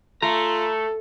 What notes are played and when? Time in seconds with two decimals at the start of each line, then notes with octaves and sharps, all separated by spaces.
0.22 A3 F4 A4 A#5